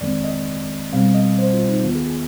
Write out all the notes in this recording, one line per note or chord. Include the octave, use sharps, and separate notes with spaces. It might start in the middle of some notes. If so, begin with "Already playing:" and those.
F2 D#3 G#3 C4 D5
D#5
B2 G3 C4 F5
D#5
C5
F4
D#4
D#2 D#3 B3 F4
G#4
G#4